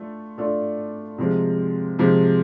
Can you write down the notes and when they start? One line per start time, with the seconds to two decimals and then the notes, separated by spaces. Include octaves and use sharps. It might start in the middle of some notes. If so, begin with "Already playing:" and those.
Already playing: A3 D4 F4 A4
0.38 A3 D4 F4 A4
1.18 C3 F3 G#3
1.99 C3 F3 G#3